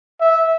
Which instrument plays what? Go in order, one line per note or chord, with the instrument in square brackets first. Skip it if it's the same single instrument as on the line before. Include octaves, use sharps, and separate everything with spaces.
[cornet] E5